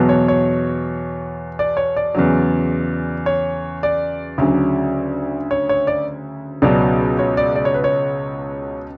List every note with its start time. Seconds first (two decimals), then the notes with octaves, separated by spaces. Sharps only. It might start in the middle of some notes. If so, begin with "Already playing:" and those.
Already playing: E2 B2 F#3
0.09 C#5
0.28 C#5
1.59 D5
1.77 C#5
1.96 D5
2.14 E2 C#3 F#3
3.26 C#5
3.83 D5
4.38 D2 C#3 F#3
5.51 C#5
5.69 C#5
5.87 D5
6.62 C#2 B2 F#3 D5
7.19 C#5
7.37 D5
7.55 D5
7.65 C#5
7.74 B4
7.84 C#5